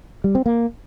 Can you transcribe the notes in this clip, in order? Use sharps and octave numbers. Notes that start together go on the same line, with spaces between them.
G3
C4
A#3